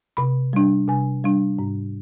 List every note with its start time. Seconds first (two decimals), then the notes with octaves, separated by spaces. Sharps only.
0.17 C3 B5
0.53 G3 D4
0.88 C3 G#5
1.24 G3 D4
1.59 G#2